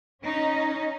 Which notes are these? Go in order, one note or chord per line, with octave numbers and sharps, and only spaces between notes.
C#4 D#4